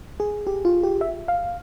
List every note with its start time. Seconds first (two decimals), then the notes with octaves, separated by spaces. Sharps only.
0.20 G#4
0.47 G4
0.65 F4
0.83 G4
1.01 E5
1.28 F5